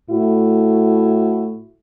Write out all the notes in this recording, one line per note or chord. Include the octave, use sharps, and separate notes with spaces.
A2 A3 E4 F#4